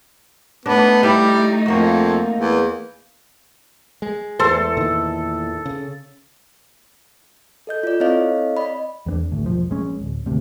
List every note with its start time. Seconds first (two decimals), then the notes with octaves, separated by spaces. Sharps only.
0.66 A3 B3 D4 D#4
1.03 G3 E4
1.66 F2 A#3 F#4
2.38 E2
4.02 G#3
4.40 E2 A4 C5
4.77 A#2 D#3
5.66 C#3
7.67 A4 D#5 G6
7.83 F4 D5
8.00 C4 E4 A4 C#5 D#5 F5
8.57 D5 D#5 B5
9.06 E2 B3 D4
9.32 G#1 D2
9.44 E1 A#1 F3
9.70 A#1 G#3 C#4
10.01 D1
10.26 G#1 D2 C3